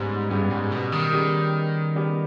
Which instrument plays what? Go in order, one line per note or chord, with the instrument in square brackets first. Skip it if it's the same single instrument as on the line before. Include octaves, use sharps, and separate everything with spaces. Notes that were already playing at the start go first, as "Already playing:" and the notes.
Already playing: [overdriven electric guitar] G#2 [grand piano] C#3 G3 B3 G4
[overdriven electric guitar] G2 [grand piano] C#3 G3 B3 G4
[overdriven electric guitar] G#2
B2
D#3
[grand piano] C#3 G3 B3 G4
C#3 G3 B3 G4